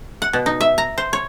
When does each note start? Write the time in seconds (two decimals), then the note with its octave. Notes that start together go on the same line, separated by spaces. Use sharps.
0.22 F#5
0.33 B2
0.46 D#4
0.61 E5
0.78 A#5
0.98 C5
1.13 C#5